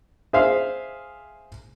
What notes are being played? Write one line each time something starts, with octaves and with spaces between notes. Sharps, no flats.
G#4 C5 E5 F5